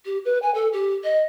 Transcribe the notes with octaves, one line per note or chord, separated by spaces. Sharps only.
G4
B4
G#5
A4
G4
D#5